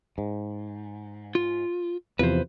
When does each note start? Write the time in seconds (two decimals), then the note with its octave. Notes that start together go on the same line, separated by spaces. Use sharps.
0.18 G#2
1.35 F4
2.19 E2 C3 F3 B4 C5